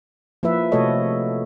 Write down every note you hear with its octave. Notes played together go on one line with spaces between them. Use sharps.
F3 A#3 E4 B4 E5
C3 A3 F#4 A4 C#5 D#5